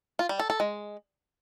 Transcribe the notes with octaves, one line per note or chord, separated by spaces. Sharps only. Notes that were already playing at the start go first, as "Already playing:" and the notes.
F4
G3
A4
A4
G#3